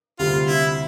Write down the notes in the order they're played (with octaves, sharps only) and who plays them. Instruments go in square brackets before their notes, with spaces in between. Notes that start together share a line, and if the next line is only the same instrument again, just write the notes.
[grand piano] D2 C3 G3 [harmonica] F4
[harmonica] E4